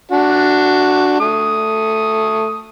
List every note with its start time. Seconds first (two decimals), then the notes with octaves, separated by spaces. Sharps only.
0.11 D4 F#4
1.20 A3 D#6